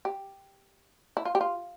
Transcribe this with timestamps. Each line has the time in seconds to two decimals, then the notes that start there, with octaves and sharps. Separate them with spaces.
0.05 G4
1.17 E4
1.25 F4
1.35 G4
1.41 F4